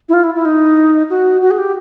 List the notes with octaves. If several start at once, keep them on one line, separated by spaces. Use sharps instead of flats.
E4
F4
E4
E4
D#4
F#4
F#4
G#4
G4